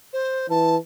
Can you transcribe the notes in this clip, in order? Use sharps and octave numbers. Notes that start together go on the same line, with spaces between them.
C5
E3 A5